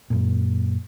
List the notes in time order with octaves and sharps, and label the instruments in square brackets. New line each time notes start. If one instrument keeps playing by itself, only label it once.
[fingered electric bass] F#2 A#2